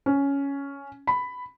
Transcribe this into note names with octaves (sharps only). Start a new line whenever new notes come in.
C#4
B5